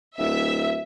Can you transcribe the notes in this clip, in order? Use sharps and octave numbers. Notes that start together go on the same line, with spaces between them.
D1 E5